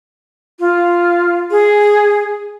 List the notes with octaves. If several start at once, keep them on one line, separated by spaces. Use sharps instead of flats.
F4
G#4